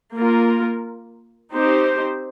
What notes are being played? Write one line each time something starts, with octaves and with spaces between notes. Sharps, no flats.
A#3 F4 A#4
C4 D#4 G4 C5